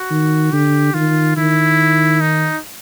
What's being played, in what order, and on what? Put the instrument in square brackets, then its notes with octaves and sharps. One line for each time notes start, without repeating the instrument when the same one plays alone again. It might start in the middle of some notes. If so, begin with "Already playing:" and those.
Already playing: [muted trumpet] F#4
[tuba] D#3
[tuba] D3 [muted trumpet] G4
[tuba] D#3 [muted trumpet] F4
[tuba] D#3 [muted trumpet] E4
[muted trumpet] D#4